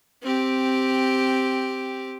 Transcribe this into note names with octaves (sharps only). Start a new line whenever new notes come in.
C4 G4